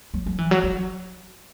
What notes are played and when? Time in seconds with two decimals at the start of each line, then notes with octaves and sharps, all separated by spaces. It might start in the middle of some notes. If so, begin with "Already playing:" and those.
0.14 F#3
0.26 F#3
0.38 E3
0.51 F#3
0.64 F#3